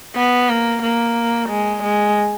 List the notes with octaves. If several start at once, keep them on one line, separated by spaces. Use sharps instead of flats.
B3
A#3
A#3
G#3
G#3